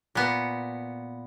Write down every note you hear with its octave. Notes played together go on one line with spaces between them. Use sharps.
A#2 B3